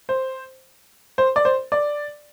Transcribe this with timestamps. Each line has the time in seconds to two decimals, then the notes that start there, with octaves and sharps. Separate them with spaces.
0.09 C5
1.18 C5
1.36 D5
1.45 C5
1.72 D5